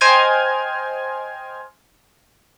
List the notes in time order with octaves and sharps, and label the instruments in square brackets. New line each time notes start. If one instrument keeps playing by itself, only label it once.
[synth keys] C5 D#5 G5 G#5 F6 G#6